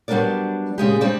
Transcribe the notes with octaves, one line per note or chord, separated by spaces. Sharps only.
F#3 G3 B3 D4 A#4 D5
A#2 C#3 G#3 G4
G3 C4 D4 D5